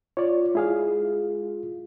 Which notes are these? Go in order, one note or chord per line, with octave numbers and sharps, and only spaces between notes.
F4 C#5 D5
G#3 E4 G#4 F5